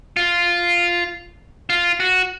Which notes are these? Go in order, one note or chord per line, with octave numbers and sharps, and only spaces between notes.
F4
F4
F#4